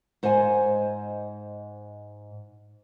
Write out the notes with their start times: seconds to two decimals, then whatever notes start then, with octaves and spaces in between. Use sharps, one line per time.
0.23 G#2 C5 D#5 F5 G#5